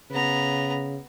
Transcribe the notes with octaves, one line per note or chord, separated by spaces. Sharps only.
C#3 B3 A#5